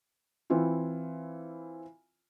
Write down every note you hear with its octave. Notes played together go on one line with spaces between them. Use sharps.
E3 C4 E4 F4